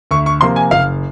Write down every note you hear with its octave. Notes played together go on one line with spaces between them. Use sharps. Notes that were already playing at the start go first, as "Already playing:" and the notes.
D2 C#6
C#6
C3 F3 A#3 C6
G#5
F#1 F5